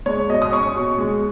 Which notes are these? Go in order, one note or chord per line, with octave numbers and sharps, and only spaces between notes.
G#3 C#5
B2 D#5
D#6
C#4 C#6
B2
G#3